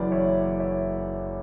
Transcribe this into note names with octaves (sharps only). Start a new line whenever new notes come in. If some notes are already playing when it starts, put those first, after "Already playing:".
Already playing: F#1 F#2 E3 B4 D5
C#5 E5
C#5 E5